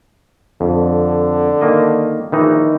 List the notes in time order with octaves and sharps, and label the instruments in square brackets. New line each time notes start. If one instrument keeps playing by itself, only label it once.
[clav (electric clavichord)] F2 [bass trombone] D3
[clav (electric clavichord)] D#3 A#3 D#5
[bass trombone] A#1 [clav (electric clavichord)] D#3 E3 D#4